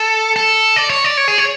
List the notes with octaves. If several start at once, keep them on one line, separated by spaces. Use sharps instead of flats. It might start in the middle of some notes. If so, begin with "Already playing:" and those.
Already playing: A4
A4
D5
C#5
D5
C#5
G#4
C#5